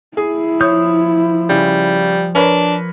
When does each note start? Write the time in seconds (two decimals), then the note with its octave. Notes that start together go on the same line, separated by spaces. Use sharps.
0.17 E4 G#4
0.61 F3 C#5 D#6 G6
1.49 C#3 G3
2.35 D4 A#4 B4 C#5